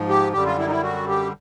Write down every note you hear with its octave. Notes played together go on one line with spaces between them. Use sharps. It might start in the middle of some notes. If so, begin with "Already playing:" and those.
Already playing: G#2 F3
G4
F#2 D3 G3 G4
F4
E4
D#4
E4
F#4
G4